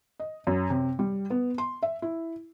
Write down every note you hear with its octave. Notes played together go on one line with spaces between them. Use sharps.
D#5
F#2
C3
G3
B3
C6
E5
E4